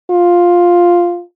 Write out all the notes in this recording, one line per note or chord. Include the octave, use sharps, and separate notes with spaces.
F4